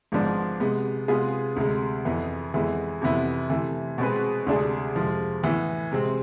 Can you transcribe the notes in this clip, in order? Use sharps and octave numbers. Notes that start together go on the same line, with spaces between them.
G#1 G#2 F3 B3 D4
C3 G#3 B3
C3 G#3 B3 F4 G#4
D2 C3 G#3
F2 E3 B3
F2 E3 G#3 B3
F2 C3 E3 B3 E4
C3 E3 A3
B2 G#3 C4 G#4 B4
D2 C3 G#3 D4 G#4
F2 C3 F3 G#3
A2 E3 B3
C3 G#3 C4